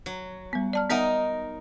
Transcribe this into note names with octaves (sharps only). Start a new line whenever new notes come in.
F#3
G3 B3
D5 A5 F6
B3 D#4 A#4 D#5 E5 F#5